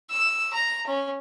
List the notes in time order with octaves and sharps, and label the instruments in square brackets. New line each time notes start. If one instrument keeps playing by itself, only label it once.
[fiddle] E6
A#5
C#4